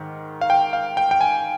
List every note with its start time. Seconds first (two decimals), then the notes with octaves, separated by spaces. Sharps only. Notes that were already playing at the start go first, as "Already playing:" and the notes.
Already playing: G#2 D#3
0.41 F5
0.50 G5
0.73 F5
0.97 G5
1.11 G5
1.21 G#5